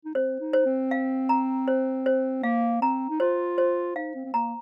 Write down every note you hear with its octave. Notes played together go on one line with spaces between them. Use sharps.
D#4
C4 C5
D#4
C5
C4
F5
A#5
C5
C5
A#3 F5
C4 A#5
D#4
F4 C5
C5
D#4 F5
C4
C4
A#3 A#5